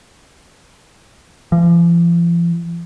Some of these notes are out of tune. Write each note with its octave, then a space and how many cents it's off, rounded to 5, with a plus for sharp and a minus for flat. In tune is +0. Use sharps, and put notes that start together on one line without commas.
F3 -40